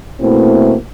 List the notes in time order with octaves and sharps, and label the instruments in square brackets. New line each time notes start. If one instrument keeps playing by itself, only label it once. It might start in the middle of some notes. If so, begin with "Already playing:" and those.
[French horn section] B2 A3 A#3 C4 E4